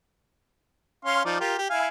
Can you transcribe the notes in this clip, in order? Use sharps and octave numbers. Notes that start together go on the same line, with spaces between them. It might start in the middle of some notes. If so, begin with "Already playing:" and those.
C#4 F5 C6
F3 D#4 D5
F4 G4 A#4
G4
E4 F5 G#5